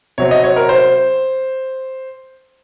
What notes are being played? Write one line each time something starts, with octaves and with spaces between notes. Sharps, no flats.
C3 F#3 C4 C#5
D#5
C#5
A#4
C5